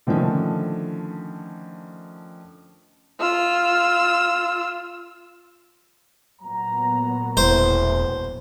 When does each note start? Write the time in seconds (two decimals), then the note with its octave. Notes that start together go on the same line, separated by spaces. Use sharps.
0.07 D3 D#3 F3 A3 C#4
3.20 F4 E6
6.42 A#2 F#3 B3 A#5
7.37 E1 A2 E3 C5